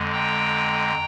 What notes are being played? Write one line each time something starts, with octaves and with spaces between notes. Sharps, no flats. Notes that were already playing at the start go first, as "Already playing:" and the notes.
Already playing: F2 D3 G#3
G5 A#5